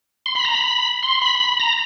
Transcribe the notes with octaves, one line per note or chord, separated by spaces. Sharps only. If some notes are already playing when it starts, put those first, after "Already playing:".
C6
B5
A#5
B5
C6
B5
B5
A#5